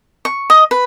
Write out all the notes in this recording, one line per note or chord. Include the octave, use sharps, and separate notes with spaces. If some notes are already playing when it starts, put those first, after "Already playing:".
C#6
D#5
B4